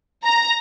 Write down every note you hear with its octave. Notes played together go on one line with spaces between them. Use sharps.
A#5